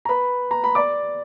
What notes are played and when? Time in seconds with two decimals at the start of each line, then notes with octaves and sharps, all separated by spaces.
0.05 A#5
0.09 B4 B5
0.51 A#5
0.64 B5
0.75 D5 D6